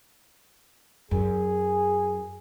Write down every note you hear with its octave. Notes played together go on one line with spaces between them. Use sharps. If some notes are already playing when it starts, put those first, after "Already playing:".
F#2 G#4